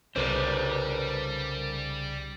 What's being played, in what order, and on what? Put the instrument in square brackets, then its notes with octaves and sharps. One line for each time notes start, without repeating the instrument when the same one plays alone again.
[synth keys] C2 D6 [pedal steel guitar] C#3 D#4 [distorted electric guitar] G3 [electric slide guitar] A4 A#4 C5